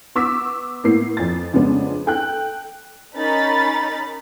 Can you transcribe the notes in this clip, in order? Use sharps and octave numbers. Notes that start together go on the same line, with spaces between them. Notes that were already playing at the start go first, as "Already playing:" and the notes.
B3 C#6 D6 E6 B6
A2 A#3 B3 C7
F2 A6
F2 C#3 G#3 B3 D4
A4 G5 F#6
C#4 D#4 A#4 B5 A6